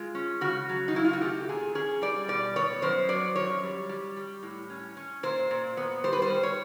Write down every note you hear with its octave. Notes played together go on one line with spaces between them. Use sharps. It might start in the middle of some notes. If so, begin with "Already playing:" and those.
Already playing: G#3 F4
C#4
C#3 F#4
F#3
D#4
C#3 E4
F4
F#4
A3 G4
A#2 G#4
C#4 G#4
G3 D5
B2 D5
B3 C#5
F#2 C5
F#3 D5
F#2 C#5
G3
G3
G3
A2
C#4
C#4
A#2 C5
A#2
B3
G3 C5
B4
C5
G3
C#5